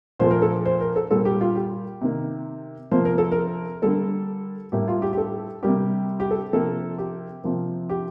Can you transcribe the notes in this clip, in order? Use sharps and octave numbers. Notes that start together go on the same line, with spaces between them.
A#2 F3 A3 C5
A#4
A4
C5
A#4
A4
A#2 G3 A#3 A4
G4
F4
G4
C3 D#3 A#3
C3 F3 A#3 C5
A#4
A4
A#4
D3 G3 A#3 A4
A2 G3 A#3 G4
F4
G4
G4
A4
C3 G3 A#3 G4
G4
A4
C3 F3 A#3 A4
G4
C3 F3 A#3
G4